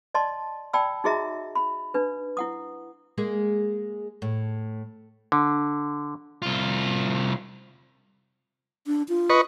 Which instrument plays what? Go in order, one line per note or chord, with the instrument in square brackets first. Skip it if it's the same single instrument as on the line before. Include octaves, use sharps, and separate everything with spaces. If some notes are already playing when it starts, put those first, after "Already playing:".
[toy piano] D5 D#5 A5 C6
D5 G5 A5 B5 E6
D#4 F#4 G#4 D#5 E5 A#5
B5
D4 B4
E4 F#5 D#6
[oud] G#3 A#3 G#4
A2
[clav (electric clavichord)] D3
[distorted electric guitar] C2 F4
[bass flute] D4
F4
[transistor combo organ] B4 D#5 C#6